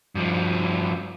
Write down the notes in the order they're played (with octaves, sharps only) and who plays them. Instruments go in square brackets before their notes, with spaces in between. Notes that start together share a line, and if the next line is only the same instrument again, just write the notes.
[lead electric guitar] G2 F3